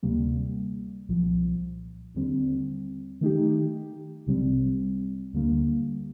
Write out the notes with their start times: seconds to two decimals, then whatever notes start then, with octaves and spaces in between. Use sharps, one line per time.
0.03 D2 C3 G3 A#3
1.09 C2 A#2 F3
2.14 D#2 D3 G3 C4
3.21 D#3 A3 D#4 G4
4.27 C2 C3 G3 C4
5.33 D2 D3 G3 A#3